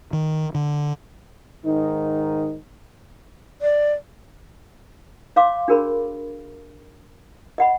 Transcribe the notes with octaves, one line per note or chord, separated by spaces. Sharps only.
D#3
D3
G#2 D#3 D#4
D5
C#5 F5 C6 D6
D4 F#4 G#4 A#4 C#5 B5
D#5 F#5 B5